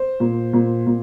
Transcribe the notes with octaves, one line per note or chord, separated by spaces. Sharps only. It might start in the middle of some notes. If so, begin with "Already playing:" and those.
Already playing: C5
A#2
A#2
A#2